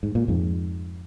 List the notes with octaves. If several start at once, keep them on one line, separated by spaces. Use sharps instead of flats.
G#2
A#2
F2 G#2